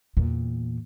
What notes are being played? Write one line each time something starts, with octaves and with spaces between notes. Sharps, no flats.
E2 A#2